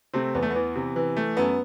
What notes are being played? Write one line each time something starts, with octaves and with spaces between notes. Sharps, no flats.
C3 A3 C4
E2 B3
A3
B3
E3
C3
E3
A3
F#2 B3